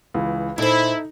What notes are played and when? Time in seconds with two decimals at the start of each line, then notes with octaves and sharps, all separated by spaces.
0.14 C#2 E3
0.58 A#2 D#4 E4 A4 C5